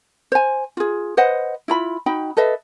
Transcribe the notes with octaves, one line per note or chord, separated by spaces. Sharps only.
C5 G#5
F4 G#4
B4 C5 D#5 F#5
E4 F4 B5
D#4 F#4 G5 B5
A4 B4 D#5 E5